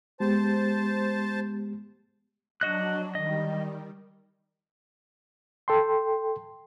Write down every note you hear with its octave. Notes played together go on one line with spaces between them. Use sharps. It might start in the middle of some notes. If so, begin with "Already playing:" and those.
G#3 B3 G4 C5 A5
F#3 D4 F#4 D#5 F#6
D#3 G3 D#5
A4 G5 C6